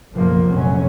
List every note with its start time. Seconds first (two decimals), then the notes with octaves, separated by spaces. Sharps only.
0.13 F#1 B1 F3 A#3
0.48 F1 A#1 F#3 C#4